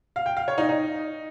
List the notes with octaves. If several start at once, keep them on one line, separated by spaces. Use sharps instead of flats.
F5
G5
F5
C#5
D#4
D#4